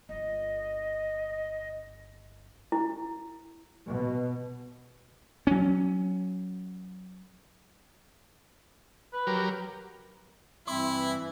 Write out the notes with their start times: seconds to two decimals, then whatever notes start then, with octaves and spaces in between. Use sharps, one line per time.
0.09 G1 D4 D#5
2.72 E4
3.87 B2
5.47 F#3 C#4
9.13 B4
9.27 F#3 G4 A#4
10.67 G2 E3 C4 E4 C6